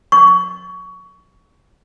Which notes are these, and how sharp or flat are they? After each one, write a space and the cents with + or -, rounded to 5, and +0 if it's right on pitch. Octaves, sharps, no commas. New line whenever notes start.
C#6 +20